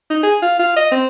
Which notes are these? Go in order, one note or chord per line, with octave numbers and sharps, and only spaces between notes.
D#4
G#4
F4
F4
D#5
C4